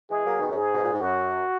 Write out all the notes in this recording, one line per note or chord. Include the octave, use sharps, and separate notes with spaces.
E3 G#3 G#4
F#3 A#3
B2 D#3
F#2
G#2 G#4
B2
A#2
G#2
F#2 F#4